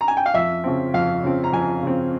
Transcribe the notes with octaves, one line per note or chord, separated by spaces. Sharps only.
A#5
G#5
G5
F5
F2 E5
C#3 F3 C4
F2 F5
C#3 F3 C4
A#5
F2 G#5
C#3 F3 C4